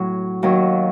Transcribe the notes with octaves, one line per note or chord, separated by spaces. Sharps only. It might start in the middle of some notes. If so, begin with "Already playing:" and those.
Already playing: A2 F#3
D#2 D#3 F#3